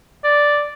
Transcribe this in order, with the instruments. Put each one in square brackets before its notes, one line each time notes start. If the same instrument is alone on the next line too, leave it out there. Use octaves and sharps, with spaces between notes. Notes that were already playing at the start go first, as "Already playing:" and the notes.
[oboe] D5